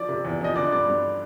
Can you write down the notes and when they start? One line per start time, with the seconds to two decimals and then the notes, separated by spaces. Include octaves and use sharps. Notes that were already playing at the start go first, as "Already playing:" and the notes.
Already playing: F3 D5
0.09 C3
0.25 E2
0.41 F3 D#5
0.56 D3 D5
0.72 G2 D5
0.87 G2